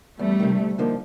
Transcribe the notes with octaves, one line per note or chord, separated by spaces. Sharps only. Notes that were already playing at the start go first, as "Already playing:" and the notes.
E2 G3 A3
C3 D#3
D2
D3 F3 A#3 D#4